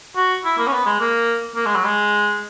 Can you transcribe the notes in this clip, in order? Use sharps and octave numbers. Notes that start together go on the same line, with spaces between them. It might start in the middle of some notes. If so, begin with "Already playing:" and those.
F#4
E4
A#3
C#4
B3
G#3
A#3
A#3
G#3
F#3
G#3